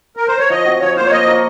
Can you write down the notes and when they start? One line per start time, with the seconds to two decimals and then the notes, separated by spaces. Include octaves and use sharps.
0.17 A#4
0.28 C5
0.38 C#5
0.50 F3 D#5
0.65 C4 F#4
0.80 F3 C#5
0.96 A#3 F4 C5
1.06 C#5
1.11 A#3 D#5
1.27 F4 A#4 C#5